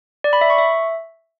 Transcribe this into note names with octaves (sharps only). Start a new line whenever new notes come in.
D5
B5
E5
C#6
E5